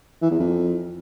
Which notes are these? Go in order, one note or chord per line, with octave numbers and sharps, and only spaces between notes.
E3
E2
F2